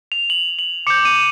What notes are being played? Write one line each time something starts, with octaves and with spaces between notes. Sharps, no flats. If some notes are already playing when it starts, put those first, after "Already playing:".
F7
F#7
F#7
D6 G6 C#7
D#7